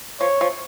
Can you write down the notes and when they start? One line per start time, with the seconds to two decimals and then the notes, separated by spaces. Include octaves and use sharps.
0.20 F3 C#5
0.41 F3